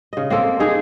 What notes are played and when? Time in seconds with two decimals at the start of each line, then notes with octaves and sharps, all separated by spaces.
0.13 C#3 D#5
0.30 A#3 C4 A4
0.60 C4 D#4 G#4